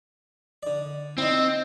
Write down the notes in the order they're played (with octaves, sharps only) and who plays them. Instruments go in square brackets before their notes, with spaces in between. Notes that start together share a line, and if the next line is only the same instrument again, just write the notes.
[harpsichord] D3 D5
[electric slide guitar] C4 [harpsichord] D#4 E4